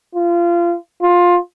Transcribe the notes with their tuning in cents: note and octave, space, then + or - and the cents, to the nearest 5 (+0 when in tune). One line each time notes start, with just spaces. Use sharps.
F4 -25
F4 +15